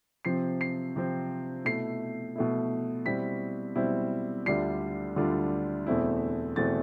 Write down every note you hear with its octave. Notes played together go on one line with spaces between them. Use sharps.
C3 F3 C4 C7
C7
C3 F3 C4
B2 A3 E4 C7
B2 A3 E4
B2 G3 C4 E4 B6
B2 G3 C4 E4
D2 D3 G3 D4 F4 C7
D2 D3 G3 D4 F4
E2 B2 A3 C4 E4
E2 B2 A3 C4 E4 A6